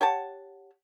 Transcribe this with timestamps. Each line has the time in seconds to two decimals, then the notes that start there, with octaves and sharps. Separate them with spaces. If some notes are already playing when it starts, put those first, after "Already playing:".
0.01 G4 C#5 F#5 A5